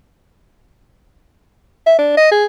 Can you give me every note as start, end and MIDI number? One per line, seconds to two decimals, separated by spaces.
1.86 1.95 76
1.99 2.15 62
2.18 2.30 75
2.32 2.45 68